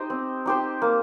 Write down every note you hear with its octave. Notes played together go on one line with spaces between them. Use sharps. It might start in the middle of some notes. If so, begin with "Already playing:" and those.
Already playing: D#4 G4 C5
C4
D#4 G4 C5
A#3